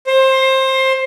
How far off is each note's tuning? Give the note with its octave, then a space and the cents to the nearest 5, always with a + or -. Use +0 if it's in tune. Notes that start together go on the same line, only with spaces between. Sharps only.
C5 +20